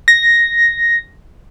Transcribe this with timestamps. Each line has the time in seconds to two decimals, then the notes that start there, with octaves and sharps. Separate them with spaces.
0.08 A#6